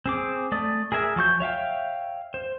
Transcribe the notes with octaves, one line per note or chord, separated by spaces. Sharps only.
C4 G#4 D6
A3 D5 D#6
G#4 A#4 E5 G#5
F3 F#3 C#6 G6
C#5 E5 F5 G5
C5